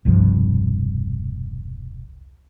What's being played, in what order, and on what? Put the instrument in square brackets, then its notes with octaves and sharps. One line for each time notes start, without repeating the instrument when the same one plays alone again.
[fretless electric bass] E1 C2 G2 F3